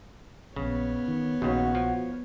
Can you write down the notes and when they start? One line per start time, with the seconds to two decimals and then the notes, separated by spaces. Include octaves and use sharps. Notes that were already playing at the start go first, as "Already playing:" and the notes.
0.56 A#1 C#3 B3 C#5
1.08 D#3
1.42 A#1 D#2 C#3 F#4
1.75 F3